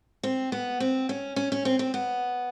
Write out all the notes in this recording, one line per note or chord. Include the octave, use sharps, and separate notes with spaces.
C4
B3
C4
C#4
C#4
C#4
C4
C4
B3